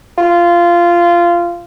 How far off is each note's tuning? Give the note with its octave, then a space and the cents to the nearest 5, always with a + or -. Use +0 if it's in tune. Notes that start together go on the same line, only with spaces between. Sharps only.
F4 -15